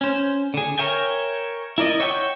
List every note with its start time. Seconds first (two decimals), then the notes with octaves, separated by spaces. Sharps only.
0.01 C#4 C5
0.54 D3 G#4
0.78 A#4 C#5 E5 G5 G#5
1.78 E4 A#4 D5 D#5
2.00 C#5 E5 F#5 G5 C#6